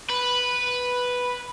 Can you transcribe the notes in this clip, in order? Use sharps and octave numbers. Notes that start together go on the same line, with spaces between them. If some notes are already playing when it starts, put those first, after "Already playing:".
B4